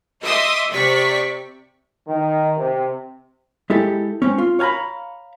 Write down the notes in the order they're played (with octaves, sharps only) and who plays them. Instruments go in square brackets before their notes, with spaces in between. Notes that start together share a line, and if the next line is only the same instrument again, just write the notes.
[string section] D#5 E5 C6 D6 D#6
C3 D5 C#6 B6
[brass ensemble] D#3
C3
[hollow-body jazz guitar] G#3 E4 G4 A4
G#3 C4 C#4
F4
C#5 F5 G#5 A#5 B5